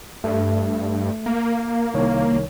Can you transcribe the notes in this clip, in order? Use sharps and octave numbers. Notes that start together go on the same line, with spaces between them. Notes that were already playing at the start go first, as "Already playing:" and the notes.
G2 A3
A#3
C2 D#3 C#5